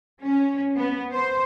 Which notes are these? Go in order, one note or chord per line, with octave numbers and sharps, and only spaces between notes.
C#4
B3
C5